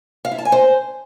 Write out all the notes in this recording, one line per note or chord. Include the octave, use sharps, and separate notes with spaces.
F5
E4
A5
G#5
C5